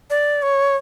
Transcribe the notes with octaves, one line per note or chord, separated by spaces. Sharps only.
D5
C#5